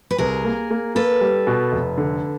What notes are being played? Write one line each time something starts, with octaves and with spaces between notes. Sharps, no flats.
B4
C2 G#4 A#4
A#3
A#3
A#3 A4 B4
G3
B2
F1
D3